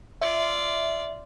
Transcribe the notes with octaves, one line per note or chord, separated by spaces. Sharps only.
F4 D5 E5